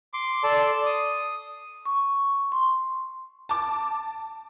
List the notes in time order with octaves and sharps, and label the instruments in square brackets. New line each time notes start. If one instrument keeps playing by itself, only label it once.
[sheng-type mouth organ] C6 D6
A4 D5 A5 C6
D#6
[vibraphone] C#6
C6
[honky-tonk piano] A5 D6